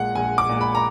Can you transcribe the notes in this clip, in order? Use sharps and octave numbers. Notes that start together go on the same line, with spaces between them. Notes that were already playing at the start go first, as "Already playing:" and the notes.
Already playing: A#1 A#2 G#3 F#5
A#1 G#5
D6
A#2 G#3
B5
A#5